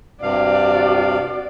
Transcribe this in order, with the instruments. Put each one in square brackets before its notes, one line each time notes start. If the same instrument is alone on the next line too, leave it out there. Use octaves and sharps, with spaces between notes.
[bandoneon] G2 C3 F5 [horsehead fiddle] F#4 D5